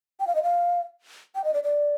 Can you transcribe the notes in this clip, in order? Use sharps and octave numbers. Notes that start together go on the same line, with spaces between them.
G5
F5
D#5
F5
G5
D#5
D5
D5